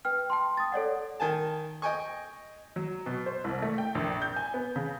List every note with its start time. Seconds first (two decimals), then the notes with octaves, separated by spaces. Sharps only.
0.05 B4 G5 F6
0.30 G5 A5 C6
0.57 D#6 A6
0.72 A4 C#5 D5 F#5
1.20 D#3 G#5 A5
1.82 D#5 G5 G#5 C#6
2.76 F#3
3.06 B2
3.26 C5
3.44 C2
3.62 A3
3.78 G5
3.95 A#1
4.22 G6
4.36 G#5
4.54 B3
4.76 C#3